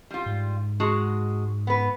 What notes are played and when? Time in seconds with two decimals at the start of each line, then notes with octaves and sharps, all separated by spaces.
0.11 G3 F4
0.26 G#2
0.80 G#3 F#4 A5
1.67 B3 B4